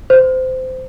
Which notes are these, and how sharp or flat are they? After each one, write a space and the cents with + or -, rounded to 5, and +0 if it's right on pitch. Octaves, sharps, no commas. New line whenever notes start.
C5 -20